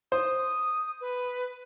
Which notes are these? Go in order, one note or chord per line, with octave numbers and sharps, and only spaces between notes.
C5 D#6
B4